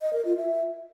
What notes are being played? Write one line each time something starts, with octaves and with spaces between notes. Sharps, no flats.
D#5
A#4
F4
E5